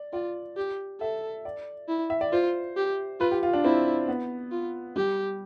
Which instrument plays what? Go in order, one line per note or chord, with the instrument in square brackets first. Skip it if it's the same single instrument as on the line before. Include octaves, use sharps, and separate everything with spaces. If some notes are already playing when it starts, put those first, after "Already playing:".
Already playing: [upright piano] D5
[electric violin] F4 [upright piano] D5
[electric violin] G4
[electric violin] A4 [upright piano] E5
[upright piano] D5
[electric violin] E4
[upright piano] E5
D5
[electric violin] F4 [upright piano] C5
[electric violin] G4
[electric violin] F4 [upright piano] B4
[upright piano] G4
F4
D4
[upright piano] C4 [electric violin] E4
[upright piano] B3
[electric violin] F4
[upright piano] G3 [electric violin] G4